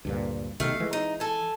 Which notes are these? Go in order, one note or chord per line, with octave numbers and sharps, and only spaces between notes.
D2 G2 A#2
B1 C3 D#3 A3 F5
E3 G#3
D#4
A4 G#5